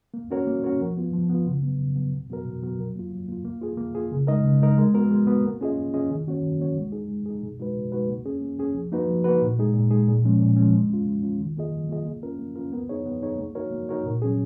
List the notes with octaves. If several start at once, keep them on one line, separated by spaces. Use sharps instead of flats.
A#3
C#4 F#4 A#4 C#5
A#3
C#4 F#4 A#4 C#5
F3
B3 F4
F3
B3 F4
C#3
F#3 B3
C#3
F#3 B3
B2
F#3 B3 F#4 A#4
B2
F#3 B3 F#4 A#4
F#3
A#3 F4
F#3
A#3 F4
A#3
F4 G#4
A#3
F4 G#4
C#3
G#3 D#4 A#4 D#5
C#3
G#3 D#4 A#4 D#5
G#3
B3 F#4 A#4
G#3
B3 F#4 A#4
A#3
C#4 F4 G#4 D#5
A#3
C#4 F4 G#4 D#5
D#3
A#3 C#4 F#4 C#5
D#3
A#3 C#4 F#4 C#5
G#3
D#4 G#4
G#3
D#4 G#4
B2
G#3 D#4 F#4 B4
B2
G#3 D#4 F#4 B4
A#3
C#4 G#4
A#3
C#4 G#4
F3
A#3 D#4 F#4 B4
F3
A#3 D#4 F#4 B4
A#2
G#3 D#4 G#4
A#2
G#3 D#4 G#4
A#2
F3 G#3 C#4
A#2
F3 G#3 C#4
G#3
C#4 F4
G#3
C#4 F4
D#3
A#3 F4 G#4 D#5
D#3
A#3 F4 G#4 D#5
A#3
C#4 F4 A#4
A#3
C#4 F4 A#4
B3
D#4 G#4 C#5
B3
D#4 G#4 C#5
A#3
D#4 F#4 A#4 C#5
A#3
D#4 F#4 A#4 C#5
A#2
F#3 C#4 G#4